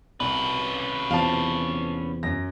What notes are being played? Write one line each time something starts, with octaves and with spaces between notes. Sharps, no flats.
C2 C#4 B4
E2 C3 F3 F5 A5
F#2 A#6